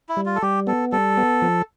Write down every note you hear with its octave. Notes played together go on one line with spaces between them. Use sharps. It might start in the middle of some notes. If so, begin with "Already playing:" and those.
E4
G3
F4
A4
G3 G4
B3 A4
G3 A4
B3
F3